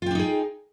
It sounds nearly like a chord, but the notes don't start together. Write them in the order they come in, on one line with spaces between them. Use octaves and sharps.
F4 G5 D4 D#4 G#4